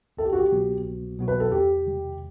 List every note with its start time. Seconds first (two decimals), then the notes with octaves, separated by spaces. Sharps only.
0.17 C2 A4
0.25 G4
0.33 F#4
0.39 G4
0.52 B2 F#3 B3 F#4
0.85 C2
1.18 B2 F#3 B3 F#4
1.28 B4
1.40 A4
1.51 E2 G4
1.85 C3 D#3 G3